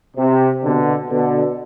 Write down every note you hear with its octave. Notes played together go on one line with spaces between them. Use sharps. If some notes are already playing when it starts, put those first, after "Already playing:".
C3
B2 D3
B2 D3